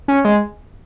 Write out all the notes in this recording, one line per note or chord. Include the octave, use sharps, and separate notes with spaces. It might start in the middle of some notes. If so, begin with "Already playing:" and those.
C#4
G#3